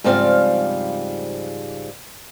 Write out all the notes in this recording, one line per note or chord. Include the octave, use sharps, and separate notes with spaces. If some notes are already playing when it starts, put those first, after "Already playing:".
G#2 C#3 F3 G3 C4 F5